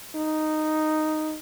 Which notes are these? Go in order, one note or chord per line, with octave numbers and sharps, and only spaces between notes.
D#4